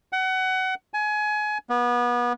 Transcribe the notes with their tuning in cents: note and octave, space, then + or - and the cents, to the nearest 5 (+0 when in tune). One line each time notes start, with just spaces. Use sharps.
F#5 +25
G#5 +25
B3 -30